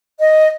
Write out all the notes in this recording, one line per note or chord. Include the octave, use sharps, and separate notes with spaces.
D#5